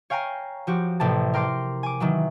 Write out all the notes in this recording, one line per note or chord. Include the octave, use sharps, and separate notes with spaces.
C#5 F5 G5 G#5 A#5
F3 F#4 G4
A1 A2 C3 G4 A5
A#4 G5 C6 D6
G#5 D6
D#3 E3 F#3